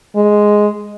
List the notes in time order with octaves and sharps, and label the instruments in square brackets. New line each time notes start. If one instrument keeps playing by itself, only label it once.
[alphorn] G#3